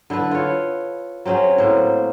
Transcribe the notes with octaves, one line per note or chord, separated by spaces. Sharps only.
D3 E4 A4 B4
F4 C#5
F#3 C4 C#4 G#4
A2 A#3 C5